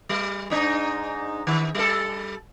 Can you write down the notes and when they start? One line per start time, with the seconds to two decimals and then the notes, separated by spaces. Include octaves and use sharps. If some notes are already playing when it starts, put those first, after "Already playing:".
0.09 G3
0.50 G#2 D4 D#4
1.47 D#3
1.75 G3 A4